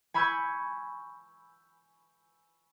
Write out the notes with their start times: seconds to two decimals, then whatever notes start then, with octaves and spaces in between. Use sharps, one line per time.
0.14 G#5 B5 C#6 E6 G6 G#6